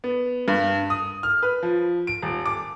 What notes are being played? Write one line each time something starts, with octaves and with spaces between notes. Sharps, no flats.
B3
G2
D#6
F6
B4
F3
D7
D#1
D6